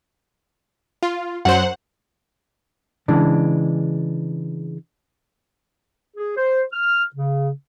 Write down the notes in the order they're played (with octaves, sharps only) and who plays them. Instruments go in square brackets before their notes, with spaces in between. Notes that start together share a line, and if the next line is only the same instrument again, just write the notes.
[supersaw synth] F4
[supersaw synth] F#2 F#3 C5 [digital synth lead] F#5
[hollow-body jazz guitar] C#3 E3 G#3 D4
[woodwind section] G#4
C5
F6
C#3